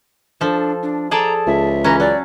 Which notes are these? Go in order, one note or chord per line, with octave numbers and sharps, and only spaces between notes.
F3 D4 A4
D4
G#4 A4 D5 A5 A#5
C#2 E5
E3 C#4 A#5
F#3 D5